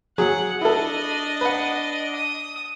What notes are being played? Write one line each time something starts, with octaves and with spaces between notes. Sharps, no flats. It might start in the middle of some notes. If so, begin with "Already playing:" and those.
F#3 G#4 F#5
D4 E4 A4 D#5
B4 F#5
D#6